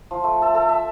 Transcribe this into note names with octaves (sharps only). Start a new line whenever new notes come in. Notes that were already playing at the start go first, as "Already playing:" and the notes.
F3
A3
A4
A4
E5